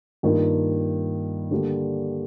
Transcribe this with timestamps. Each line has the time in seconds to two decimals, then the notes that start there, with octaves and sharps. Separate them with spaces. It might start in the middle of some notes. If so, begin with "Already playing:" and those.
0.23 G2 D#3 A#3 F4 A#4
1.51 D3 G3 A#3